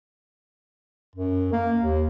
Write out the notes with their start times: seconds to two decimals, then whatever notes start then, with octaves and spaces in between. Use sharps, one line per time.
1.16 F#2
1.53 A#3
1.81 D#2